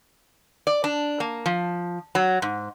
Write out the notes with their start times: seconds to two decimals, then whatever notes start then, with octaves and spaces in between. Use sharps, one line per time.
0.67 D5
0.84 D4
1.20 A#3
1.46 F3
2.15 F#3
2.42 G#2